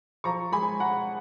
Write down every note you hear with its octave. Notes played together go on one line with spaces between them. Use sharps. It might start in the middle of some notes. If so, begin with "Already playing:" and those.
F3 A#5 C#6
G#3 G#5 B5
G#3 F#5 A#5